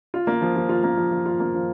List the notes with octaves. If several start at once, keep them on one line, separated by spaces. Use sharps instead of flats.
F4
A#3
F3
F3
F4
A#3
F3
F3
F4
A#3
F3